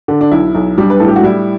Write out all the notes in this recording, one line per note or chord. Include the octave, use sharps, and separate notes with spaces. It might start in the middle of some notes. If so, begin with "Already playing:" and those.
D3 D4
D4
B1 E4
B1
G3 D4
B4
A2 A4
G4
F#4
G3 E4